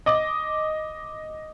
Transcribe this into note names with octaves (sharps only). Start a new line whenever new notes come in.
D#5 D6